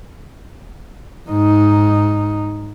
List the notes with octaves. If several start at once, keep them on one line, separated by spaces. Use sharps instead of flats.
G#2 D#4